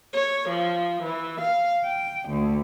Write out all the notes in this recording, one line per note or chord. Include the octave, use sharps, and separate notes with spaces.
C#5
F3
E3
F5
G5
D2